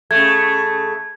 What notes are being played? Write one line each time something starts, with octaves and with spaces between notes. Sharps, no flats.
C#3 A3 G#6